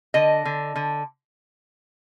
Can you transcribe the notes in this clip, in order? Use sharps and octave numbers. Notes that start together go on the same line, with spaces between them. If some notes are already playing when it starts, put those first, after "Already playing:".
D3 D#5
D3
D3